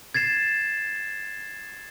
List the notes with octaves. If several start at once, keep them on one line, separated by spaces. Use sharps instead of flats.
G#6 A6 C7 E7